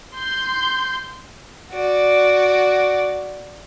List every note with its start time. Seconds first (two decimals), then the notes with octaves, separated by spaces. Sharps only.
0.14 C6 G6
1.72 F#4 D5